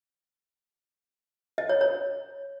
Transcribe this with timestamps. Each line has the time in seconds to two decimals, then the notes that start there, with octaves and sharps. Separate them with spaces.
1.58 D#5
1.69 C#5
1.81 C#5